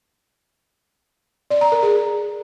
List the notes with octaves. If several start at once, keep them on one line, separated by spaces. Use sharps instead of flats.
D5
A#5
A#4
G#4